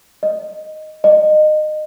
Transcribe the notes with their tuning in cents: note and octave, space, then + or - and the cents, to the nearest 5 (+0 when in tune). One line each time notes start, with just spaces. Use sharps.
D#5 -5
D#5 -25